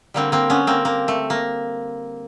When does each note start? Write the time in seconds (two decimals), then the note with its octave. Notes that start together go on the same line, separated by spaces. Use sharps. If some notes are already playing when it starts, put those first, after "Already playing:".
0.14 D3 G3 A#3 C4
0.32 A#3 C4
0.50 B3 C#4
0.67 A#3 C4
0.85 A#3
1.08 A3
1.30 A#3